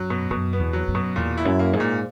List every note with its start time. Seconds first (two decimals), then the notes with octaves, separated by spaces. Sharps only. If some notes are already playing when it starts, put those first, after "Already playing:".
Already playing: F#2 F#3
0.10 B2
0.30 F#2 B2
0.53 B3
0.59 E2
0.73 F#3
0.88 F#2
0.95 B2
1.16 E2 A#2
1.38 E4
1.45 F#2
1.59 A#3
1.73 G#2
1.80 A#2